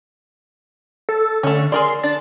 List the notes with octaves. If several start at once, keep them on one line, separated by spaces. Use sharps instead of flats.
A4
D3 A3 C#4
G#4 A#4 D5 C6
D4 A6